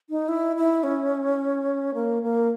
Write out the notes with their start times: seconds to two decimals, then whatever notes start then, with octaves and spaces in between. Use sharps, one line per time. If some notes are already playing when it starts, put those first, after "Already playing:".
0.10 D#4
0.28 E4
0.56 E4
0.83 C#4
1.94 A#3
2.23 A#3